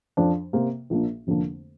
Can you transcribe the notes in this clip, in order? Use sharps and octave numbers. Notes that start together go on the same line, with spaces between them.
F2 F3 D4
C3 A#3 G4 C5
A#1 A#2 A#3 D4
F1 F2 D3 A#3 D4